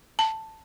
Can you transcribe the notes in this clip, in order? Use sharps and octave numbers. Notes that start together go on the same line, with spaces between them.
A5